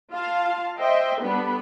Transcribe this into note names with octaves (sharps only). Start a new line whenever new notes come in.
F4 F5 A5
C5 D#5 E5 G5 C6
G3 B3 D4 A4 B4 B5